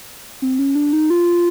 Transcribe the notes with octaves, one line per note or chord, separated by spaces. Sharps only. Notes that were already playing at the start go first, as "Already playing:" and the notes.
C4
C#4
D4
D#4
F4